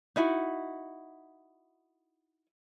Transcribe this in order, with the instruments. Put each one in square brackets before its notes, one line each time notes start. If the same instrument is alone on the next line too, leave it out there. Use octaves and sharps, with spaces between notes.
[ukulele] D#4 E4 F#4